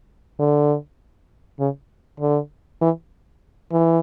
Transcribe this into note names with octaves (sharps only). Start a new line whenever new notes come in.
D3
C#3
D3
E3
E3